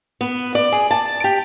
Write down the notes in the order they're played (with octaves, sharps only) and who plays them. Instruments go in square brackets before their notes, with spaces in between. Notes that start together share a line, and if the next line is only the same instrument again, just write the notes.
[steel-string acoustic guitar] B3
D5
G#4
A5
G4